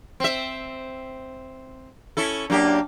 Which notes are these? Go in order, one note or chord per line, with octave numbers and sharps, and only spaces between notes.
C4 E5
C#4 E4 A4
F#2 A#3 D4 G4